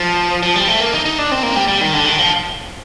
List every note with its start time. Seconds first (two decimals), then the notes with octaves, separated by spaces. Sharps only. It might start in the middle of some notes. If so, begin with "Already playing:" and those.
Already playing: F3
0.43 F3
0.56 G3
0.68 A3
0.80 A#3
0.93 D#4
1.05 D#4
1.19 D4
1.31 C4
1.43 A#3
1.56 G3
1.68 G3
1.81 D#3
1.94 D3
2.06 D#3
2.18 F3